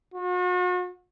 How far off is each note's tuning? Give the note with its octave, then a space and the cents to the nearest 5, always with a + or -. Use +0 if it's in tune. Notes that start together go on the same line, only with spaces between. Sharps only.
F#4 -40